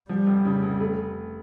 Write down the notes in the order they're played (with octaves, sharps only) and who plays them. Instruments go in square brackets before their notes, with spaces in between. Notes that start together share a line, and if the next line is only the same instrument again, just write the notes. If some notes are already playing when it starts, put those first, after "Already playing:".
[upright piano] F3 [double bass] G3
[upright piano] F1
C#3
F1
A3